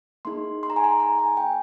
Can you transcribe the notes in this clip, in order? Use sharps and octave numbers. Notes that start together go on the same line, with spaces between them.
A#3 D#4 G#4 C6
C6
A#5
G#5
A#5
A#5
G#5
G5